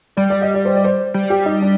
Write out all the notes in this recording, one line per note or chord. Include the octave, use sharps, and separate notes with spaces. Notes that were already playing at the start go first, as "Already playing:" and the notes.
G3 D5
D5
D#5
D5
C5
D5
C5
G3
G4
D#4
D4